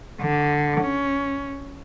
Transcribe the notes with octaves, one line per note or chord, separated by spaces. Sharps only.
D3
C#4